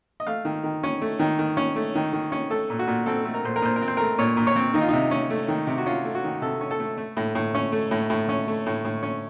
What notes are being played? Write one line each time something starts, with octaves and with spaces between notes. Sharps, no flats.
D#5
A3 F5
D#3
D#3
C#4
A3
D#3
D#3
C#4
A3
D#3
D#3
C#4
A3 A4
A#2
F#4
A#2
C4 A4
A3
A#4
A#2 C5
A#4
A#2 C5
A#4
C4
C5
A3 A#4
A#2 C#5
A#2
C#5
C4
D#3 D#4
F4
C3 D#4
C#4
A3
D#3
C3
F#4
C#4 F4
A3
F#4
D#3
C3 A4
C#4
A4
A3
A3
A2
A2
C#4
A3
A2
A2
C#4
A3
A2
A2
C#4